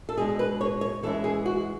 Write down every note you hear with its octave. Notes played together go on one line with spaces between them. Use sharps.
A4
B2 G#3 D4 G#4
B4
C#5
C#5
E3 G#3 C#4 E4 A4
G#4
F#4